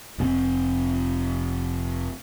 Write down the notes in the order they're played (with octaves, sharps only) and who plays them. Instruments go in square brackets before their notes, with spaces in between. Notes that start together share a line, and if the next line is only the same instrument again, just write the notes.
[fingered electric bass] F1 B2 C4